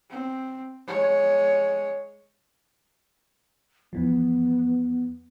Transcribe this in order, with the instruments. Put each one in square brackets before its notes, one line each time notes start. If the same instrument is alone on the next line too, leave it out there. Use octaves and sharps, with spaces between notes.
[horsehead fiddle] C4
G#3 C#5
[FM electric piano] E2 E3 F3 [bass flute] B3